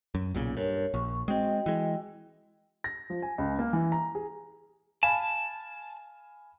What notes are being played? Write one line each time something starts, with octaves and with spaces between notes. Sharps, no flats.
F#2
B1 A#2 C#3
G2 A#4 C#5
A#1 C#6
G#3 C4 F#4 D#5 G5
E3 G#3
A#6
F3
G#5
C#2
A#3
E3
A#5
G#4
F5 G#5 A5 B5